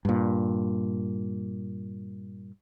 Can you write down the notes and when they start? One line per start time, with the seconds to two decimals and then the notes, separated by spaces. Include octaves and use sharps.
0.05 G2 A#2